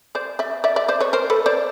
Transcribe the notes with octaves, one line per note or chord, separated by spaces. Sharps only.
C5 D5
D5 E5
D5 E5
D5 E5
C5 D5
B4 C#5
A#4 C5
A4 B4
C5 D5